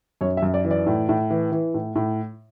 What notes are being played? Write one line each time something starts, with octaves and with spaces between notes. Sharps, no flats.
F#2 C#5
E5
F#2
D5
E3
D5
A2
A2
E3
E3
A2
A2